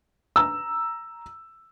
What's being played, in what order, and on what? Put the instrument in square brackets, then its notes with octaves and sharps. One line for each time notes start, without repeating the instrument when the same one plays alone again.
[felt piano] A#5 E6